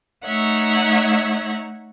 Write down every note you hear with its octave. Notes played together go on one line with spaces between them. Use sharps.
A3 D#4 C#5 E5 F#5